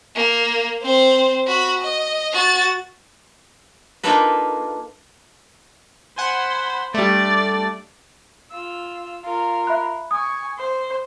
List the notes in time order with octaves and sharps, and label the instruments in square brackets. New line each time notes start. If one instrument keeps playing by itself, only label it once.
[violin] A#3
C4 C5
F#4 B5
D#5
F#4 A6
[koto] A#3 D4 D#4 F4 A4 B4
[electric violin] C5 B5 [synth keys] F#5 G#5
[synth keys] G3 A3 [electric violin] D4 D5
[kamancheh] F4 E6
F4 A#4
[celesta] E5 B5 F#6
[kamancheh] G#5 C#6 [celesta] D#6
[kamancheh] C5